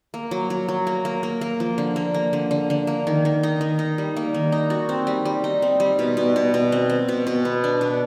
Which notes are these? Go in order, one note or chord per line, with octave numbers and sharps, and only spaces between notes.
A#3
F#3
F#3
F#3
A#3
A#3
A#3
A#3
F3
D3
A#3
A#3
D3
D3
D3
A#3
D#3
D#3
D#4
D#3
D#4
G3
A#3
D#3
D#4
F#4
C4
G3
G3
D#4
C4
G3
B2
B2
B2
B2
C4
C4
B2
B2
B3
D4
B2